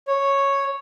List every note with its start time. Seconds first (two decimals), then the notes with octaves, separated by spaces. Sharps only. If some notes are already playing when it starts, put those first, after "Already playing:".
0.07 C#5